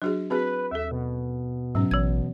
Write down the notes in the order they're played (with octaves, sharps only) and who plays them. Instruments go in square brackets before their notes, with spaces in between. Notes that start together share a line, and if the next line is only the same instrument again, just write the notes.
[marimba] F#3 [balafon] D4 F#4 G#4
[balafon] C4 F#4 G#4 [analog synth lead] B4
[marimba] D#2 A4 [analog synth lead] E5
[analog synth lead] B2
[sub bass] G#2 [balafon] F#3 C#4
[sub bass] A1 [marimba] E3 G#6